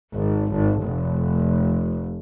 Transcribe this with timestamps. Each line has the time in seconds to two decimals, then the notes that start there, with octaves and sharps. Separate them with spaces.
0.13 G#1
0.51 G#1
0.81 F1